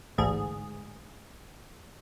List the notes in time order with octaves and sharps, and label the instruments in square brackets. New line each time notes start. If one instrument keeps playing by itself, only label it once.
[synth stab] A1 D2 G#2 G#4